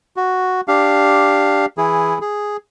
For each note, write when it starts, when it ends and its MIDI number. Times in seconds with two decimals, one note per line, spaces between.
0.16 0.61 66
0.68 1.66 62
0.68 1.66 67
0.68 1.66 77
1.78 2.18 52
1.78 2.18 64
1.78 2.18 68
2.21 2.57 68